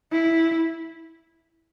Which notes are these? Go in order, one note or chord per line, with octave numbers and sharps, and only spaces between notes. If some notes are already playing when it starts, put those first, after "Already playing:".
E4